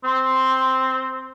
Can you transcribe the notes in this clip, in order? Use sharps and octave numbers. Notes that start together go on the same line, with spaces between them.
C4 C6